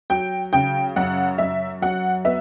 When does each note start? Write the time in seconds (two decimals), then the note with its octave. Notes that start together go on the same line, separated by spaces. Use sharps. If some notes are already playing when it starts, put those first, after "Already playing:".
0.10 F#3 G5
0.53 C#3 G5
0.96 F#2 F#5
1.38 F#2 E5
1.82 F#3 F#5
2.25 B3 E5